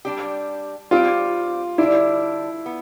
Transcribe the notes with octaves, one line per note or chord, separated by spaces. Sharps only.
G3 D4 G4
G3 C4 F4 G4
D3 G3 D4 E4
B3